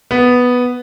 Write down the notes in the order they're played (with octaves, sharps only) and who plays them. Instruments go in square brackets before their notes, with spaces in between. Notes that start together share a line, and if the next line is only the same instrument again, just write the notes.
[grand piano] B3